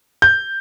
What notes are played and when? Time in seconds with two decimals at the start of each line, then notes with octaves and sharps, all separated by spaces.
0.22 G6